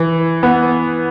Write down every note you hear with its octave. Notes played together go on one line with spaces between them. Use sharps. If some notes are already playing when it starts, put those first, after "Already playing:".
Already playing: E3
B3